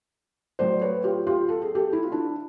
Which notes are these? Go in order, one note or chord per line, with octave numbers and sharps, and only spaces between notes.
A2 F#3 C5 D5
B4 C#5
F4 G4
F4 G4
A4
G#4
G4 A4
E4
F4
D4 E4